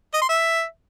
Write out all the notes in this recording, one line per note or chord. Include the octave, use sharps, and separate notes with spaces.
D#5
C6
E5